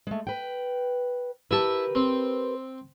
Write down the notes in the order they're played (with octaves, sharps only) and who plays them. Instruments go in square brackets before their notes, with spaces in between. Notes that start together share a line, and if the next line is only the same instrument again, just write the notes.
[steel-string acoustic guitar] G#3 A3
B4 G5
[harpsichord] E4 E5 A5 [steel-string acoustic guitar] G4 A#4 B4
[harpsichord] C4